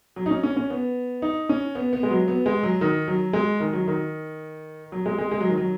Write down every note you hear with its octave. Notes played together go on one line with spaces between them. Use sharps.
F#3
D#4
C#4
C#4
C#4
B3
D#4
C#4
B3
B3
G#3
F#3
B3
G#3
F#3
D#3
F#3
G#3
D#3
F#3
D#3
F#3
G#3
G#3
G#3
F#3
D#3
F#3